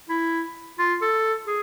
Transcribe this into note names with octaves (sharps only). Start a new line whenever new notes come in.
E4
F4
A4
G#4